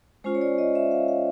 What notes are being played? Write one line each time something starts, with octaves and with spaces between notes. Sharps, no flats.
G#3 C#4 F4 C5
C#5
D5
D#5
E5
F5
F5